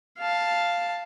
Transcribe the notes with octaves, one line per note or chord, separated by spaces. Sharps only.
F5 A5